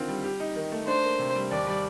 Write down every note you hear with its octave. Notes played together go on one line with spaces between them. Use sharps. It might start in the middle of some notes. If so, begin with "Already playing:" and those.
Already playing: D3 D#3 C4 F4
G3
G4
D#4
D#3
A3
D4 C5
A#3
C3
G3
D#2 D5
G3